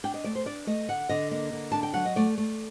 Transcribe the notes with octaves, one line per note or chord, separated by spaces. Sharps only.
D4 G5
D#5
A3 D5
C5
D4 D5
A3 D#5
D3 F#5
D3 D#5
A#3 D#5
D3
D4 A5
G5
F#3 F#5
D#5
A3 D5
A3